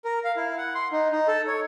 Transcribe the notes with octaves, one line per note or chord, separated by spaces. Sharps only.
A#4
F5
E4
F#5
C6
D#4
D#4
A4
C#5